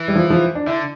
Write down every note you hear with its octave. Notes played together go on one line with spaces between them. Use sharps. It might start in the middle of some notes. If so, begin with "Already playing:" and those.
Already playing: E3
G3
F3
F3
D4
D3 E4